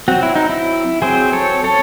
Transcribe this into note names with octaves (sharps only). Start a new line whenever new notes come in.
F#3 C4 F#4
E4
D#4
E4
F#3 C4 G#4 C5
A4 C#5
A4 C#5